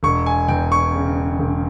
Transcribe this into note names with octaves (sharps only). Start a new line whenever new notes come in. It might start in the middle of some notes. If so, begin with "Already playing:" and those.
E1 C#6
G#5
E2 G5
C#6
C#3
E1